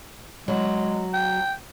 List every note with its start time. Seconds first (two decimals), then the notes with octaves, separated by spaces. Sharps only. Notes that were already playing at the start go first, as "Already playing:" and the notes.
0.48 F#3 G#3
1.14 G5